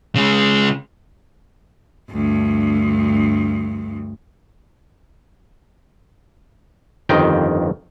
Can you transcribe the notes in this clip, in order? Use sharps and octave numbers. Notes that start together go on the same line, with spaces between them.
C#3 G#3
D2 G2
G1 F2 D#3 D#5 G5